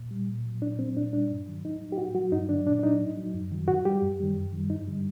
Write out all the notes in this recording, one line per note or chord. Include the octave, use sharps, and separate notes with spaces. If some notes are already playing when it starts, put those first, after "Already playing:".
Already playing: A#2
G3
A#2
F#3
A#2 D4
F#3 C4
A#2 D4
G3 D4
G2
D#3 F#3
A2 D#4
F#3
G4
A2 F#4
F#3 F#4
G2 D#4
D3 F#3 D4
A#2 D4
D4
F#3 D#4
A2
F#3
F#2
D#3 F#3
A2 F#4
G3 G4
F#2
D#3 G3
F#2
D#3 G3
G2 D#4
D3 G3